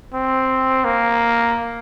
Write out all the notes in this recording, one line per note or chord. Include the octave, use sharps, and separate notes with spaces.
C4
A#3